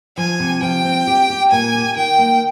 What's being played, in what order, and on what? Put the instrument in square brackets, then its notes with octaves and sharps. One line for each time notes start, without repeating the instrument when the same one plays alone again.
[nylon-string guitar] F3 [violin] G#5
[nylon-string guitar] C3
[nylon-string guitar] F3 [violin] G5
[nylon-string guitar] C4
G4
G4
[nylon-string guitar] A#2 [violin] G#5
[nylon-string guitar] G4
[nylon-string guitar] D#3 [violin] G5
[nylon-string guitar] A#3